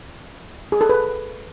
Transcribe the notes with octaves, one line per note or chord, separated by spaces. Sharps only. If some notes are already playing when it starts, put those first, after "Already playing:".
G#4
A4
B4